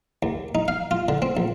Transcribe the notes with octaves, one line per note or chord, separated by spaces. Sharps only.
D#2
D#4
F5
F4
D3
C4
A#1